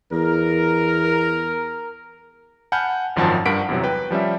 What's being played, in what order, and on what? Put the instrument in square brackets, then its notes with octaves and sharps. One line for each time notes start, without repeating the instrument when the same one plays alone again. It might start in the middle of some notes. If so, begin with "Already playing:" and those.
[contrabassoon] E2 [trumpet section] A#4
[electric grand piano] F#5 G#5 A5 B5 F6 G6
G#1 F#2 D#3 F3 F#5 A5
G2 A#4 F#5 B6 D7
E2 C3 F#3
B4 G5
F3 G3 C#4 E5